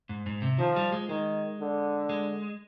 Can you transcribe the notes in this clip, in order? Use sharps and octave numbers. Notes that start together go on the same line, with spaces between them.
G#2
G#2
C3
D#3 F3
G3
G#3
D#3 G#3
D3
G#3